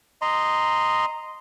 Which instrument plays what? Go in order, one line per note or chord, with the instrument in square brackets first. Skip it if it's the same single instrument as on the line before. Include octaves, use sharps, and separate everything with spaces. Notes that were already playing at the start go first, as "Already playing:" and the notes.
[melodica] D#5 A#5 C6